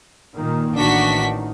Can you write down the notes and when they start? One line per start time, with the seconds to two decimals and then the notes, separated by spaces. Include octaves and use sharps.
0.35 A#2 D#3 A#3
0.75 A1 D#3 D4 F#4 B6